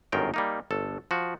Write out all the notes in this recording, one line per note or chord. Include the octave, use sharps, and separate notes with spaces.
G1 F#2 D#3 A#4 G5
G3 A#3 D#4
G1 A4
F3 F#4